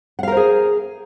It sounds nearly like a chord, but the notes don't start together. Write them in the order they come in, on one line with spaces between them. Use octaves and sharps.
F#5 F5 A#4 C5 G#4